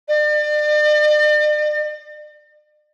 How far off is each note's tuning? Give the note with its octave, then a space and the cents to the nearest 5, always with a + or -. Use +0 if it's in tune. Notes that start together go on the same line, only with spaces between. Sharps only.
D5 +40